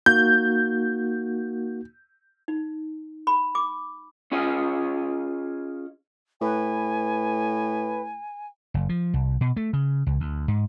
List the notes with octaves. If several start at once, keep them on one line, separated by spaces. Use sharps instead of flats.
A#3 D#4 F#4 G6
D#4
B5
D6
C#4 F4 G#4 D#5
A2 B4 G#5
F#1
F3
C2
B2
A3
C#3
C#2
D2
G#2